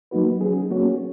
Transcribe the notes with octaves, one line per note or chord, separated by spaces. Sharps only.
F#3 A#3 D#4 F#4 B4
F#3 C#4 G#4
A#3 C#4 F#4 C#5